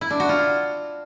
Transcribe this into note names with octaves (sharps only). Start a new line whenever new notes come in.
E4
D4
F#4
F4